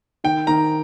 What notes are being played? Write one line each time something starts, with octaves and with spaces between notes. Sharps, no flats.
D#3 G5
D#3 A#5